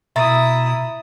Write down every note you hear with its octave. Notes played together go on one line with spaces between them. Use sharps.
B2 E4 E5 A#5 D#6 A6